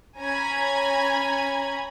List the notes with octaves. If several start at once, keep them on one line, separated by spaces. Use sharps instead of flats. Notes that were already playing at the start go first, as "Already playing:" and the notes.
C#4 G#5 A#5 B5 G#6